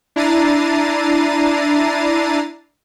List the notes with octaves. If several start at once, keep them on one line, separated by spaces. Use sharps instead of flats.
D4 E4 A#5 A6 C7 D#7